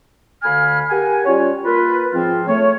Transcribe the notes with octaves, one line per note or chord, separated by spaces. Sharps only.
D2 D3 F5 G#5 B5 F6
G4 A#4 F#5 G#5
G3 C#4 F4 C#5
A#3 F4 A#4 B4
G#2 F3 C4 F4
A3 C#5